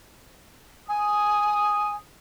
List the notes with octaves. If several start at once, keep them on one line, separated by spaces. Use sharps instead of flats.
G#5 D#6